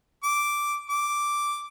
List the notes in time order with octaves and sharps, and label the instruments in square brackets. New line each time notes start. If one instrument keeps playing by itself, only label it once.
[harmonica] D6
D6